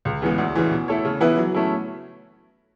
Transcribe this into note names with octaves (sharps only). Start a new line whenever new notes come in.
C#2
C#3 E3 G#3 B3
D2
C#3 E3
B2
A3 E4 A4 C#5
C#3
E3 B3 E4 B4
F#3
A3 C#4 E4